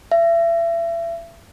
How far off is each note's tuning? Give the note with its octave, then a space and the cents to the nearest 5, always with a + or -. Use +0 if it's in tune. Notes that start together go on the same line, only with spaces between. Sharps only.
E5 +35